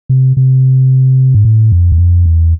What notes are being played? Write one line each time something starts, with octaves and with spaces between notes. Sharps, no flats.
C3
C3
G#2
A2
F2
E2
F2
E2